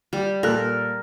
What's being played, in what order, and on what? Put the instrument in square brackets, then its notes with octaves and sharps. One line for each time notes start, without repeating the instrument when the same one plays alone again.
[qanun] G3
[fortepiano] A#2 A4 F#6 [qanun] A#4